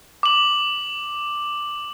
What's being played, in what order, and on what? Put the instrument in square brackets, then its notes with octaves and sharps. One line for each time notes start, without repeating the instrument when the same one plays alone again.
[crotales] D6 F#7